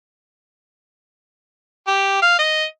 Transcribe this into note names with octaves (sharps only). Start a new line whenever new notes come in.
G4
F5
D#5